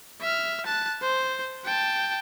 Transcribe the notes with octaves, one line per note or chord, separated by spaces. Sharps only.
E5 F6
A5 F#6
C5
G5 A5